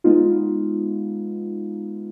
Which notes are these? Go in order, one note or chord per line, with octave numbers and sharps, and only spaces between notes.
G#3 B3 D#4 F4